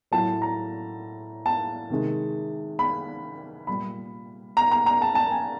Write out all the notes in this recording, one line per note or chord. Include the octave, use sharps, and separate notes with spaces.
A2 F#3 A5
A#5
A5
C3 D#3 G#3
B5
A#2 G3 B5
A#5
A#5
A#5
A5
A5
G#5